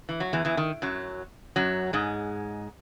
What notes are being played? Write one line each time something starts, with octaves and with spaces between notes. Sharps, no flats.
E3
F#3
E2 E3
E2 E3
D#3
F#2 F#3
F#2 F#3
G#2 G#3